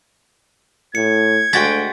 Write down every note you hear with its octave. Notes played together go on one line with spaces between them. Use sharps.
A2 G#6 C#7
D2 G#3 F#4 G5 A6 B6